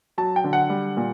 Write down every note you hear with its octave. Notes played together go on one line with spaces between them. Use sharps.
F#3 A5
G5
D3
F#5
G3
A#2